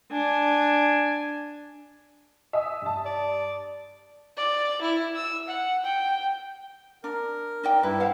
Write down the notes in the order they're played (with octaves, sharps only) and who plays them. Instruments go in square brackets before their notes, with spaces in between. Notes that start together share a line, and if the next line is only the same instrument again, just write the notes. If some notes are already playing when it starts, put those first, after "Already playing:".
[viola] D4 G#5
[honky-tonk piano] E5 G#5 D#6
G2 A5
[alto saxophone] D5
[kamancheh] D5
E4
E6
F#5
G5
[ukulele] D4 [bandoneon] A#4
[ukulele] D#4 D5 G5
[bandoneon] G2 G3 E4 [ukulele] B4
[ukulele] C5 F5 F#5